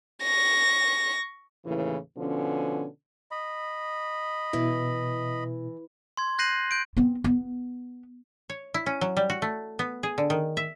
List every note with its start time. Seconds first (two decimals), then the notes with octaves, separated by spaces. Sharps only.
0.23 C#6 A#6
1.65 D#2 A2 C#3 E3
2.17 B2 D3 F3 C#4
3.31 D#5 B5
4.53 B2 E3 E4
6.17 C6 G#6
6.39 F#6 G6 A#6 C7 D#7 F#7
6.71 G6 D7
6.97 B3 C4
7.24 B3
8.50 C#5
8.74 E4
8.86 C#4
9.01 F#3
9.17 G3
9.30 F#4
9.42 A3
9.79 B3
10.03 G#4
10.18 D3
10.30 D#3
10.57 E5